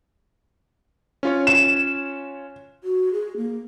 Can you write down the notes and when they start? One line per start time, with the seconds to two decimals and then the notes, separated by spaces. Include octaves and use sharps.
1.23 C#4 F4 C#5
1.47 E7
2.84 F#4
3.13 G#4
3.37 A#3